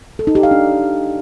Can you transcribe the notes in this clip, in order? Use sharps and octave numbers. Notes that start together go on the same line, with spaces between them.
A4
D#4
G4
F5
D4